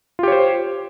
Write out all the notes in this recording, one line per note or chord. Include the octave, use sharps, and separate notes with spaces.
F4 G4 C5 C#5